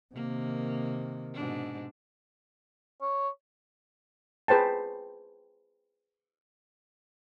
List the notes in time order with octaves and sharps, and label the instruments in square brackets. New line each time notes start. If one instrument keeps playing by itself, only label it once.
[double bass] C3 D#3 [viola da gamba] A#3
[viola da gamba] G#2 B2 D4
[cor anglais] C#5
[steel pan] G#4 B4 C5 G5 A5